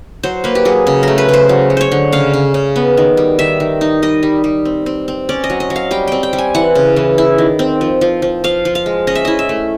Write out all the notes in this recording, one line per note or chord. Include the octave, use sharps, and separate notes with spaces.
F#3 C5
A#3 B4
G4
F#3 G#4
C#3
A3 A#4
B4
C#3 C5
F#3
F#3
C5 C#5
D3
C#3 F5
C#3
C#3
B3
D#3
G3
D#3 E5
D#3
D#4
G3 D#5
G3
G3
C4
C4
C4
C#4 D5
D#5
F#3
D#5
F#3
F5
G3 G5
C4 G5
G5
G3
G#5
E3 F#5
C#3
E3
E4
D#3
C4
F3
F3
F3
F3 F5
F3
F5
G#3
C#4 D#5
E5
E4 D#5
E5
A3